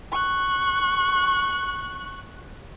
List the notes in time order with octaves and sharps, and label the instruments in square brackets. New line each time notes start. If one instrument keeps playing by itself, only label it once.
[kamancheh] C#6 F#6